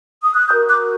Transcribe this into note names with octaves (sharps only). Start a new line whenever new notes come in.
D#6
F#6
F#4 A#4 D#6 G6
D6 F#6